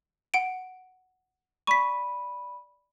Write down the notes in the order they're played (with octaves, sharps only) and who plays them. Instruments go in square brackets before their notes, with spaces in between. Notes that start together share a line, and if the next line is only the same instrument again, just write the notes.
[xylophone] F#5 D7
[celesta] D5 B5 D#7 [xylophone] C#6 B6